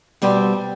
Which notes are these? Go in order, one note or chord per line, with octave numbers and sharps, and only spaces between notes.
B2 G3 C4 C5